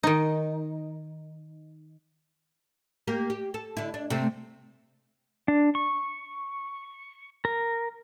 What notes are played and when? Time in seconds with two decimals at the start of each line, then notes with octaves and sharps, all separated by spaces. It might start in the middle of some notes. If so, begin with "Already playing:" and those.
0.03 D#3 D#4
3.07 A#3 G4 A#4
3.30 G4
3.54 A4
3.77 D3 E4
3.94 D4
4.10 C3 A3 C4
5.48 D4
5.75 C#6
7.45 A#4